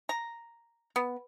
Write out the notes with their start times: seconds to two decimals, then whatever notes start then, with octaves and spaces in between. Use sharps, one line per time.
0.09 A#5
0.96 B3